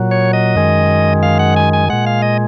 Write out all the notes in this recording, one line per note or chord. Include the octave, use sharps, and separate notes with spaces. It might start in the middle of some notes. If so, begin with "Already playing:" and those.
Already playing: A#2 F#3
C#5
D#5
F#2 D#3 G#3
F5
F#5
G#5
G#5
A#2 G#3 F#5
F5
D#5